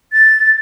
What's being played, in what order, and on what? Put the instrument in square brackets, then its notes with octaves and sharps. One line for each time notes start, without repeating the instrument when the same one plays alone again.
[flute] A6